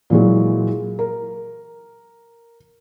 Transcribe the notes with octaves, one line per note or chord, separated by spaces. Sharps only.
A#2 E3 F#3 G#3
A#4